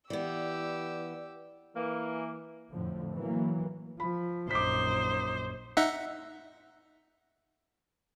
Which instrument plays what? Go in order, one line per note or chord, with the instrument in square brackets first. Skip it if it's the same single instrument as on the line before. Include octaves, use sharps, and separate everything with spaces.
[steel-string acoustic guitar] E3 B3 [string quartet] G4 E6 [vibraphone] D5
[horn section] E3 A#3
[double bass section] F2 A2 D3 F3
E3 F#3 A#3
[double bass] F3 [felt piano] B5
[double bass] A#1 F#2 [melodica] D#4 [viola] C5 [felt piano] D6 B6
[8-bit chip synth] D#4 E5 F#5